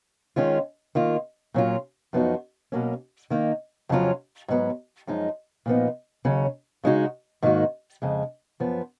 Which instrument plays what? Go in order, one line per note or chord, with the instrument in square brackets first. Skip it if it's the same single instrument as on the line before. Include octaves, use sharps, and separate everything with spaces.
[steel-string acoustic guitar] D#3 G#3 C#4 F4
D#3 A#3 F4
A#2 F#3 C#4 F4
F#2 F3 B3 D#4 F#4
B2 F#3 A#3 C#4
D#3 A#3 D#4
F2 C#3 F#3 C#4 F4
G#2 F#3 B3
F#2 F3 G#3 D#4
A#2 F3 B3 D#4
D#2 C#3 F#3 C#4
C#3 G#3 D#4 F#4
G#2 D#3 A#3 D#4 F#4
F2 C#3 G#3
F#2 F3 B3